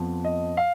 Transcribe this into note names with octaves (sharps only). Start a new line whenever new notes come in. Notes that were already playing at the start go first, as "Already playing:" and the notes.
Already playing: F2 F3 B3
D#5
F5